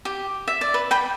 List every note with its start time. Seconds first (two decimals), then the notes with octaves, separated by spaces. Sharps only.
0.05 G4
0.48 E5
0.61 D5
0.74 B4
0.91 G5 B5